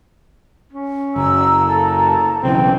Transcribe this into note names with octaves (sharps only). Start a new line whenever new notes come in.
C#4
F#1 A#5 E6
A4 A5 A#5
B1 C#3 E3 C4 G5